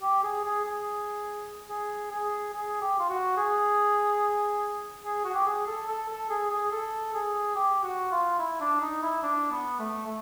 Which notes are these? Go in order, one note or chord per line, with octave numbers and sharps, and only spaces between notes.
G4
G#4
G#4
G#4
G#4
G#4
G#4
G4
F4
F#4
G#4
G#4
F#4
G4
G#4
A4
A4
A4
G#4
G#4
A4
G#4
G4
F#4
F4
E4
D4
D#4
E4
D4
B3
A3
A3